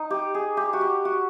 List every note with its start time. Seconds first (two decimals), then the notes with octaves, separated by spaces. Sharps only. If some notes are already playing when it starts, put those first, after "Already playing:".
Already playing: D#4
0.10 G4
0.34 G#4
0.57 G4
0.73 F#4
0.81 G4
1.05 F#4